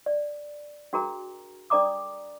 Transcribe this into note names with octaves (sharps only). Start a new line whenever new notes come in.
D5
D4 F#4 G#4 A#4 A#5
D4 A4 D5 A#5 D6 D#6